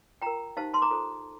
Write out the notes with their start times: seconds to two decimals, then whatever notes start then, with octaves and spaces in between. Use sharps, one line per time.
0.22 F4 A#4 G5 A#5
0.57 D#4 G4 C5 F5 A5
0.74 A5 C6
0.82 A#5 D6
0.90 F4 A4 C5